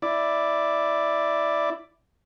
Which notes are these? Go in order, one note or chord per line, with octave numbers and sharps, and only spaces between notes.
E4 D5